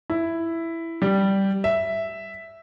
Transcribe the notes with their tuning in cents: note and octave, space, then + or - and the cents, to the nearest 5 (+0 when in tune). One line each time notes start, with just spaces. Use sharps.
E4 +5
G3 -5
E5 +0